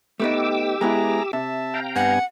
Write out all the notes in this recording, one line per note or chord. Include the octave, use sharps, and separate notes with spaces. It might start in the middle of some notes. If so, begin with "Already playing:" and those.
A3 B3 D#4 G4 D6 E6
G#3 B3 E4 G#4 A#5
C3 E5 A5
F5 G5 A#5
G2 B3 F#5 G#5